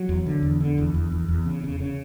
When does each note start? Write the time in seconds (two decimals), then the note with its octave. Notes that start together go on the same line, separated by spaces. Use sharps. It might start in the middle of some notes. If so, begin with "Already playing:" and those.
Already playing: F#3
0.09 E2
0.26 D3
0.43 E2
0.61 D3
0.78 E2
0.94 E2
1.12 E2
1.28 E2
1.46 C#3
1.64 C#3
1.80 C#3